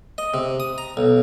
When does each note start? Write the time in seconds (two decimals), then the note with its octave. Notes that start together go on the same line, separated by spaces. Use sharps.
0.18 D#5
0.34 C3
0.60 D#6
0.78 A#5
0.97 B1